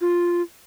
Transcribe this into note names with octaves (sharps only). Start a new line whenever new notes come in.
F4